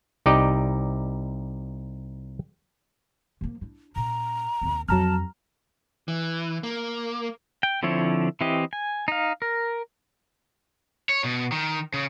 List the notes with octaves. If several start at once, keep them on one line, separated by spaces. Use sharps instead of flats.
C2 D#4 G4 D5 D#5
F3 A#3
D4 E4
A#2 C#4 A#5
D#2 C4
F2 F3 F#3 A5 A#5 F6
E3
A#3
G5
D3 F3 C4 E4 C#5
E3 C4 E4 G4 D#5
G#5
D#4 F5
A#4
C#5
B2
D#3
C#3